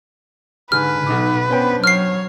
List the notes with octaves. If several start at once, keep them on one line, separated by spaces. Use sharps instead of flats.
G#2 D3 B4 F6
B1 B2 D#4 D6
B3 C#4 D4 C5 G5
F#3 C#5 F6 C7